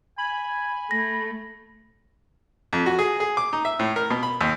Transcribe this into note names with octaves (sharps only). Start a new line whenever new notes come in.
G#5 B5
A3 A#6
F2
F#4
G#4
G#4
D6
D#4
E5
A2
A#4
B2
B5
D#2